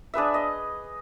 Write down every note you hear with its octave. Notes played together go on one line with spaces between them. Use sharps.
D4 G#4 B4 E5
D#5